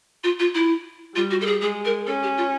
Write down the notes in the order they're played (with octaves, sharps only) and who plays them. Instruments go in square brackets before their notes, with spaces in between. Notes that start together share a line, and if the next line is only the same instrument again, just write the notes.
[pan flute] F4
F4
E4
[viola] G3 [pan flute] F4
[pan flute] F#4
A4
G#4
[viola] G#3 [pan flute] G#4
[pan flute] A#4
[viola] C#4 [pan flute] A4
[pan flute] G4
F4